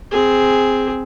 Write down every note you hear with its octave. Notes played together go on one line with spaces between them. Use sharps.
C4 G#4